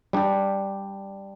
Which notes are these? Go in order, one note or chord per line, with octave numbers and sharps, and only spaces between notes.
G3 D4 G4